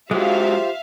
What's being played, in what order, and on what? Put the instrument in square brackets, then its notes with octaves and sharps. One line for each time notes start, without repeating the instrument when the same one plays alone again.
[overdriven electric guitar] G#2 F#3 [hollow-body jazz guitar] G#3 [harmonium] F4 G4 C5 [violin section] E5 F5